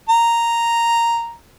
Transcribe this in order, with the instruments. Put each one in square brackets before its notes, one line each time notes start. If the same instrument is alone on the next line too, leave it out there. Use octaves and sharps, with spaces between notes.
[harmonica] A#5